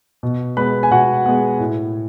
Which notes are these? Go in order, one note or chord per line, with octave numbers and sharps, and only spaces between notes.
B2
G#3 B3 B4 B5
G#5
B2 F#4 F#5
G#3 B3
A2